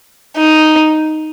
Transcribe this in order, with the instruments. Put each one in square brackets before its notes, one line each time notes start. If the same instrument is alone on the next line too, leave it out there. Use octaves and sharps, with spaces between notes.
[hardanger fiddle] D#4